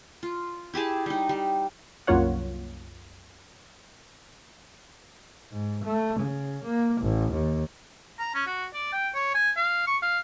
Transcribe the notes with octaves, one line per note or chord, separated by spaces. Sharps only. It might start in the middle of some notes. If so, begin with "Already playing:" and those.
F4
E4 G4 G#4 A5
G3 D#4
G3
C2 F#2 A#3 F4 C#5 F#5
G#2
A3
C#3
A#3
A1
D#2
A#5
C#4
F#4
D5
G5
C#5
G#5
F5
C#6
F5